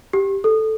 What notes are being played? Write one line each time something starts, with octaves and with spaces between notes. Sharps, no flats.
G4
A4